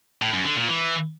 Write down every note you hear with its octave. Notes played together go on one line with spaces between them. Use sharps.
A2
F#2
D3
A#2
E3